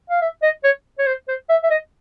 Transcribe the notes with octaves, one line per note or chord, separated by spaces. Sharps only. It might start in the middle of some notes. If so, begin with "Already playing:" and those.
F5
E5
D#5
C#5
C#5
C5
C5
E5
E5
D#5